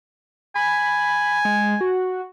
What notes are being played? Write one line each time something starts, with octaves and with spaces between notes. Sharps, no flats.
G#5 B5
G#3
F#4